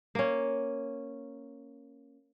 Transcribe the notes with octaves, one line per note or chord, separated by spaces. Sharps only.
A#3 C#4